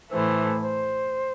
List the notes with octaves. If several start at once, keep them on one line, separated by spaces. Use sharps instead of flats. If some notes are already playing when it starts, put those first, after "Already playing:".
A2 E3 A3 C5
C5